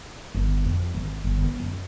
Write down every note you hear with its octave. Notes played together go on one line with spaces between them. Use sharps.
G1
F2
G#1
G1
B3
F#2